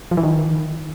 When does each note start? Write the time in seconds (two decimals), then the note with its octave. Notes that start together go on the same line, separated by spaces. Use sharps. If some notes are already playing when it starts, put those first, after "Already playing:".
0.11 F3
0.17 E3
0.23 D#3